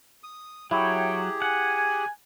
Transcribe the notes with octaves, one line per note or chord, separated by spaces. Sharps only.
D#6
F#3 E4 G4 G#4 C#5 G5
F#5 G#5